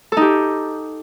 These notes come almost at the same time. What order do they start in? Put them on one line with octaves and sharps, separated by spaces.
A4 D#4 G4